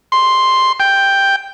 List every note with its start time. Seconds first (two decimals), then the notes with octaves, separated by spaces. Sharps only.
0.12 C6
0.80 G5